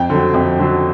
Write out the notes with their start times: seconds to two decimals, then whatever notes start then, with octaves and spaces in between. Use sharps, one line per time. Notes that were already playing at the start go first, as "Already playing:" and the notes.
Already playing: F2 G5
0.10 D3 F#3
0.34 F2
0.59 D3 F#3